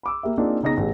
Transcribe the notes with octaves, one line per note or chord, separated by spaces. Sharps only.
B5 D6 E6
A#3 G4 E5
A#3 C4 D4 D#4 F4 G#4
C#3 B3 D#4 G#4 A#6
A1 G#4